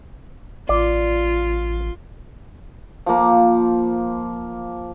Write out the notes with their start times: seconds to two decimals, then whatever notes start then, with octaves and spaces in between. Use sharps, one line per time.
0.69 A1 F4 D5
3.06 F3 A#3